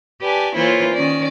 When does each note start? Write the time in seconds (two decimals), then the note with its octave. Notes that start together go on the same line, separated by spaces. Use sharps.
0.21 G4 B4 D5 G#5 A5
0.56 E3 A#3 E4 F4 C5 C#5
0.93 D#3 C#4 D5